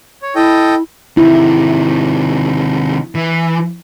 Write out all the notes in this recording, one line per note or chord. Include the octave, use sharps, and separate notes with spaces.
C#5
E4 A4 D#5 G5
C3 D#3 E4
E3